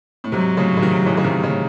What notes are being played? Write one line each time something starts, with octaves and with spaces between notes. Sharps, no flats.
A2
G#2 C3 F#3
A2 C#3
C#3
C3 D#3
C#3 E3
C#3
C3 D#3
A2 C#3